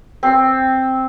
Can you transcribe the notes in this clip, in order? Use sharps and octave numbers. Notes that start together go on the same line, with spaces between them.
C4